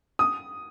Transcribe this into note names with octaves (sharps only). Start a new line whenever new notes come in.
D#6